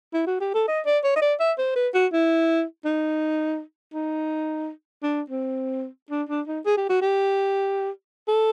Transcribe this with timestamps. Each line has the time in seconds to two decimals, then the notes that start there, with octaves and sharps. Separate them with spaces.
0.14 E4
0.27 F#4
0.41 G4
0.54 A4
0.68 D#5
0.86 D5
1.04 C#5
1.16 D#5
1.22 D5
1.40 E5
1.58 C5
1.76 B4
1.94 F#4
2.12 E4
2.85 D#4
3.94 D#4
5.03 D4
5.30 C4
6.10 D4
6.29 D4
6.47 D#4
6.65 G#4
6.77 G4
6.89 F#4
7.02 G4
8.28 A4